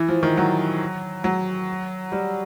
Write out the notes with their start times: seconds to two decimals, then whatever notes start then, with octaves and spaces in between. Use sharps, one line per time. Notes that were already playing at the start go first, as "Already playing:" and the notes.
Already playing: E3
0.09 F3
0.23 D#3
0.37 F#3
1.24 F#3
2.12 G3